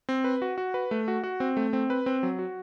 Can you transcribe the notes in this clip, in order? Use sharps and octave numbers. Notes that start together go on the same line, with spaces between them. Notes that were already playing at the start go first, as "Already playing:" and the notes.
C4
B4
F#4
F#4
B4
A3
F#4
F#4
C4
A3
C4
B4
C4
F#3
F#4